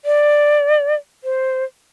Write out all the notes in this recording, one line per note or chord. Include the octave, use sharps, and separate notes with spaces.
D5
C5